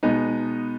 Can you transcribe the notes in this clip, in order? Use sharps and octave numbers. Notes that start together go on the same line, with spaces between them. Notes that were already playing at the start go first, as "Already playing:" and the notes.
B2 G#3 B3 D#4